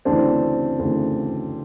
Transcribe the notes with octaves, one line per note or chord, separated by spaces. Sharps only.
D2 C#3 E3 C4 D4
D2 C#3 E3